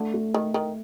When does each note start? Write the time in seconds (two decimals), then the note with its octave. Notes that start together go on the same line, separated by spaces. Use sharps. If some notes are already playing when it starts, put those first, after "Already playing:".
Already playing: D3 A3
0.14 A3
0.34 D#3 A3
0.54 D#3 A3